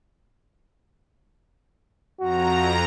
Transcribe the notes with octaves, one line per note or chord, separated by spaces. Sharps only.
F2 F#4 A#5